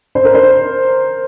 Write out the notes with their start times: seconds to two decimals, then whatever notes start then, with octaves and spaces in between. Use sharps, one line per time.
0.15 C5
0.25 A#4
0.35 C5